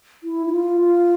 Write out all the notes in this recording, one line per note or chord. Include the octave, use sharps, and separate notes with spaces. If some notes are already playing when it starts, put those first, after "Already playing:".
E4
E4
F4
F4